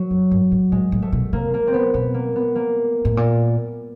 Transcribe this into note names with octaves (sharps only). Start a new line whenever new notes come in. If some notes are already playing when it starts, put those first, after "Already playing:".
Already playing: F#3
F#2
G2
G#2
A2 G#3
A2
A3
B2
C3 A#3
A#3
C4
B3
B2 B3
A#3
B3
A#3
A2
A#2